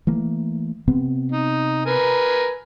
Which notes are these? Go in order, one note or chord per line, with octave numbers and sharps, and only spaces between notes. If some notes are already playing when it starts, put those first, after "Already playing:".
E3 A3 A#3
C3 B3 C4
D#4
A#4 B4 G#5